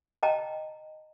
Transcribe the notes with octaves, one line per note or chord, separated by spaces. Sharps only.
D#5 G5 A5 A#5